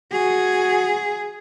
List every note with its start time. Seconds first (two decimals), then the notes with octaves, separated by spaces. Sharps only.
0.12 F#4 G#4